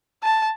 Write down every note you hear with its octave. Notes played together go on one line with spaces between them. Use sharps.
A5